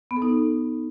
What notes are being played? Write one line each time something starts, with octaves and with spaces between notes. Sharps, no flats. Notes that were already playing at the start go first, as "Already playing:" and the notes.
B3
A4
D#4